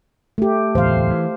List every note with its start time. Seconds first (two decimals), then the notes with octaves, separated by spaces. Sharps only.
0.38 A3 G4
0.75 D1 A1 E2 C5 F5
1.10 E3